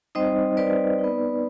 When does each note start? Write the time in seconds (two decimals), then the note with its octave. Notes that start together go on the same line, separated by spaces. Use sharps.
0.15 G3 C4 D#4 C5 D#5
0.57 B4 D5
0.99 B3 D#4